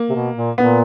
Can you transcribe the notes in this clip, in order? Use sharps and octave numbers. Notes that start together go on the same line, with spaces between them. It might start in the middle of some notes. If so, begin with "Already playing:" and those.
Already playing: A#3
C3
B2
A#2
A#2 B3